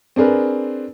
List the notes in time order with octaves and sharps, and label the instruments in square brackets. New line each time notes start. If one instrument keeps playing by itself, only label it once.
[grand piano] C4 D4 G#4 A#4 B4